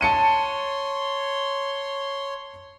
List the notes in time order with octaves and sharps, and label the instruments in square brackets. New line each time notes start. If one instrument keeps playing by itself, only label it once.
[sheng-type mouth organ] C#5 C6 [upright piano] A5 C#7 D#7